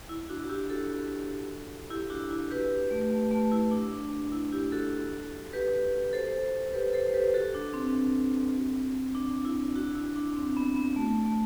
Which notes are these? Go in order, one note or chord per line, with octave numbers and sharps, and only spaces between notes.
E4
D4 F#4
F#4
E4 G4
F#4 A4
E4 G4
D4 F#4
E4
G4 B4
A3
A3
A3
E4
D4
D4
E4
E4 G4
F#4 A4
G4 B4
A4 C5
G4 B4
A4 C5
G4 B4
F#4 A4
D4
C4
D4
E4
D4 F#4
E4
D4
C4
B3
B3
A3
A3